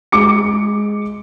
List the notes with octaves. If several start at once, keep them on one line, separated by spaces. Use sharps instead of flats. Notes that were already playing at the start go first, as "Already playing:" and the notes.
G#3 D6 C#7